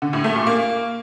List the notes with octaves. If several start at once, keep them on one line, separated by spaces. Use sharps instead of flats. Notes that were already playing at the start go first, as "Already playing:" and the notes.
D3
A2
A3
A#2
A#3